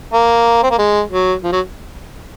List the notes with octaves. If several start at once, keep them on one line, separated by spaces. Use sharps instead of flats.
A#3
C4
A#3
G#3
F#3
F3
F#3